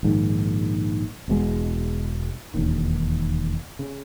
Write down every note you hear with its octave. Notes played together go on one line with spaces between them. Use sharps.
A#1 G#2 D#3
E1 E2 B2 G#3
E1 D#2 D#3
C#3